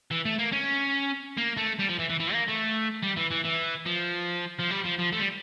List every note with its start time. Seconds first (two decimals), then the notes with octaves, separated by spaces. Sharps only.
0.11 E3
0.25 A3
0.39 A#3
0.53 C#4
1.37 A#3
1.57 A3
1.79 G3
1.88 F3
1.99 E3
2.10 E3
2.20 E3
2.33 A#3
2.48 A3
3.03 G3
3.17 E3
3.31 E3
3.45 E3
3.86 F3
4.59 F3
4.70 G3
4.84 F3
4.98 F3
5.12 A3
5.19 G3